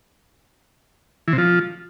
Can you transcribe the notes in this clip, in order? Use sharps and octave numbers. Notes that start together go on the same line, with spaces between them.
E3
C3
F3